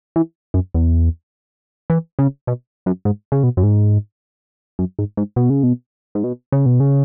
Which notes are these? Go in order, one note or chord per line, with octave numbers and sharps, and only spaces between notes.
E3
F#2
E2
E3
C#3
B2
F#2
G#2
C#3
B2
F#2
G#2
F#2
G#2
G#2
B2
C#3
B2
G#2
B2
C#3
B2
C#3